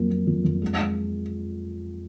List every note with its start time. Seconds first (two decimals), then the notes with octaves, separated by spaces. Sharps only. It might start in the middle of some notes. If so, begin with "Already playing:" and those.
Already playing: F2 F#3 A#3
0.10 A#3
0.27 F2
0.45 F2
0.62 G#3
0.79 G#3